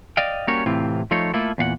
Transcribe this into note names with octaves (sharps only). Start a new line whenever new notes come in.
D5 D#5 F5 G5
G3 A#3 C#4 F#4 A#4 C#5
A2 C3 E3 C4 F4
F3 A3 D#4 F4 C#5
A3 A#3 E4 F4 A4
E2 A#2 F5 F#5